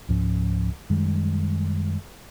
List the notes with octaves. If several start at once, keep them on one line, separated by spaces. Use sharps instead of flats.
C#2 G#2 F3 C#4
F#2 D#3 G3 G#3